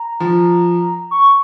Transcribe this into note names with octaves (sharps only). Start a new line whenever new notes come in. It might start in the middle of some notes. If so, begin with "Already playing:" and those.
Already playing: A#5
F3
C#6